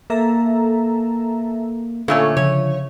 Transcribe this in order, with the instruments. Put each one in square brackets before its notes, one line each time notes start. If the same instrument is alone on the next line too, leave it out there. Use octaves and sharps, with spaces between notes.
[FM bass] A#3 [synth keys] A4 E5 A#5
[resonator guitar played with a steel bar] A#2 A3 C#4 [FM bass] D3 [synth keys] A4 F5 C#6
[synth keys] C#3 F3 [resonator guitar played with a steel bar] C#5